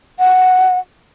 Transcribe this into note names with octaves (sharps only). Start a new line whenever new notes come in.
F#5